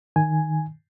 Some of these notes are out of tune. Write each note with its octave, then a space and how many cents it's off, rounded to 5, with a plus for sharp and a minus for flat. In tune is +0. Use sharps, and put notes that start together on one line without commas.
D#3 +0 G#5 +0